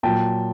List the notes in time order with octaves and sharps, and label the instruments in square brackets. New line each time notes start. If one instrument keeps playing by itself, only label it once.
[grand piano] A#2 F#3 G5 A5